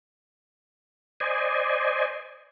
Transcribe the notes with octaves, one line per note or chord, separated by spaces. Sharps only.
C5 D5 D#5 G#5